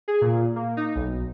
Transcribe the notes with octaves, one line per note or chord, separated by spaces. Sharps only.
G#4
A#2
A#3
D#4
B1